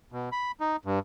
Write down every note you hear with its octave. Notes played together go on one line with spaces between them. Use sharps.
B2
B5
D#4
G2